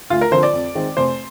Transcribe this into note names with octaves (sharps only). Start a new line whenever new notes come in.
D2 F4
A#4
D3 F3 C4 C5
D5
F2
D#3 G#3 C4
F1 C5